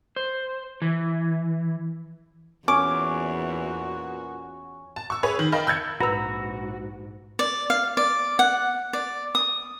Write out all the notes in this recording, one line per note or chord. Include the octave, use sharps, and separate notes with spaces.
C5
E3
E2 A#2 B3 C#4 F#4 D6
A5
C#6 E6
G#4 B4 C#5
D#3
A#4 D#5 F5 G5 A5 B5
E6 G6 G#6 C#7
A#1 G#2 F#4 B4 A#5 B5 E6
D5
F5
D5
F#5
D5
D#6